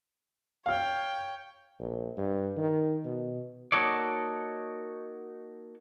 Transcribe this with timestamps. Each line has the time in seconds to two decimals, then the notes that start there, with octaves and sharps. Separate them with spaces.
0.66 C#5 F5 G5 F6
1.79 A#1
2.17 G2
2.57 D#3
3.05 B2
3.72 A#3 D#4 F#4 A4 C#5 D5